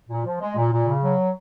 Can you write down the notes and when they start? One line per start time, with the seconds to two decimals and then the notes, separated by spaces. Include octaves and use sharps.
0.09 A#2
0.24 F3
0.40 G#3
0.55 A#2
0.71 A#2
0.87 C#3
1.02 F#3